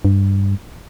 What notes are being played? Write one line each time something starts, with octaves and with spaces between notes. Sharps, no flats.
G2